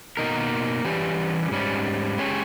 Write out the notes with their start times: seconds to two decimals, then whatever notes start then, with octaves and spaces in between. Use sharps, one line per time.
0.17 B2 A#3 D#4 A#4
0.85 E3 G3 C#4 G4
1.51 G#2 G3 C#4
2.18 G#3 C#4 G4 C#5